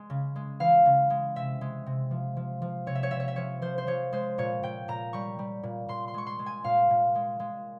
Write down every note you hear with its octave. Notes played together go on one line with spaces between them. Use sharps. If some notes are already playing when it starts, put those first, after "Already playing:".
Already playing: G#3
C#3
G#3
E3 F5
C#3
G#3
C3 E5
G#3
C3
F3
F3
F3
C3 C#5
E5
C#5
C3 E5
C#5
E5
F3 C#5
F3 C5
C5
F3 C#5
G#3 C5
A#2 C#5
A#2 G5
A#2 A#5
G3 C#6
G3
A#2
A#2 C6
C6
G#3 C#6
C6
G#3
G#5
A#2 F5
A#2
G#3
G#3